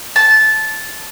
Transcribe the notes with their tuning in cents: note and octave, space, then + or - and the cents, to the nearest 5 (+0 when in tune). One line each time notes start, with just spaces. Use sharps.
A5 -15